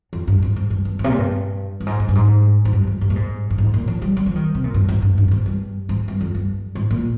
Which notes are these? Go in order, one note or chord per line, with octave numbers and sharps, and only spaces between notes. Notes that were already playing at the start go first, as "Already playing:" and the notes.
F2
G2
G#2
G#2
G2
G2
G#2
C3
A#2
G2
G2
G#2
G#2
G2
G#2
G#2
G2
F2
G2
A#2
G#2
G2
G#2
A#2
F3
G3
G3
F3
D#3
C3
A#2
G2
G#2
G2
G2
G2
G#2
G2
G#2
G2
F2
G2
G#2
A#2